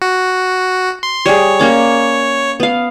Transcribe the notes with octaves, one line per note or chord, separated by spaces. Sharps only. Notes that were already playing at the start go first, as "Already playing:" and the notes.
F#4
C6
G3 G#4 C#5
A#3 C#4 D6
B3 F5